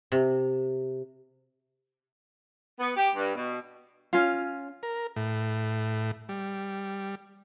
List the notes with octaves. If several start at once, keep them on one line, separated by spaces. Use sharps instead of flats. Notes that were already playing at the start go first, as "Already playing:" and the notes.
C3
B3
G4
G2
B2
C#4 F4
A#4
A2
G3